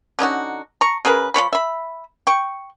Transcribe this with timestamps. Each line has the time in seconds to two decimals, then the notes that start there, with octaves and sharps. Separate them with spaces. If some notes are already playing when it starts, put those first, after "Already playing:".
0.19 D3 C#4 D#4 F#4
0.81 A#5 C#6
1.05 C#3 G#4 A#4 B4
1.34 F3 D4 C#5 B5
1.53 E5 B5
2.27 G5 C#6